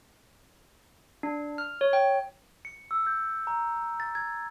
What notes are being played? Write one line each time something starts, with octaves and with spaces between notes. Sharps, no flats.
D4
F6
C#5
G5
C#7
E6
G6
A#5
A6
G#6